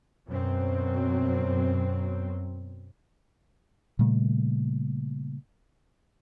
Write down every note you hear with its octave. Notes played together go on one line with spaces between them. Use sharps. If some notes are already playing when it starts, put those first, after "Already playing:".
F#2 B2 F#3 C4
A#2 C#3 G3 A3